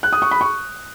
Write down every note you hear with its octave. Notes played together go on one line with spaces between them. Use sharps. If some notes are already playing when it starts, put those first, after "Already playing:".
F#6
D#6
C#6
B5
C#6